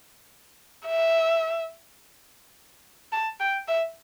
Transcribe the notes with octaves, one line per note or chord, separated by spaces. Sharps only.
E5
A5
G5
E5